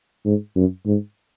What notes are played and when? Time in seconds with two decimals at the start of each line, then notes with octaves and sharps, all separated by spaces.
0.26 G#2
0.56 F#2
0.86 G#2